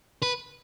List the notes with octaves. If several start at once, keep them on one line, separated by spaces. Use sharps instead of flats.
B4